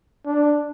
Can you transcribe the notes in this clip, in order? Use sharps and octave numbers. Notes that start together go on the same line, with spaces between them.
D4